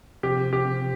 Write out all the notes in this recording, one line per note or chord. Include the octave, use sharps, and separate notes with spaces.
C3 F3 C4 G4
G4